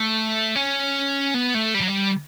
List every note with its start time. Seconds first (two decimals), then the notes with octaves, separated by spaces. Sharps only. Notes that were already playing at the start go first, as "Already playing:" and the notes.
Already playing: A3
0.55 C#4
1.34 B3
1.54 A3
1.74 G3
1.80 F#3
1.88 G3